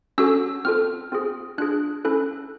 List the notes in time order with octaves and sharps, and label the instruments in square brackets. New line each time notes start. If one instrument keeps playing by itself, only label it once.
[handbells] C#4 F#4 A4 E6
C4 F4 A4 F6
C4 F4 G#4
D4 F4 G#4 F#6
C#4 E4 A4 F#6